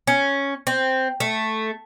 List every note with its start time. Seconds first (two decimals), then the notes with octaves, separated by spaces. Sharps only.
0.07 C#4
0.67 C4
1.20 A3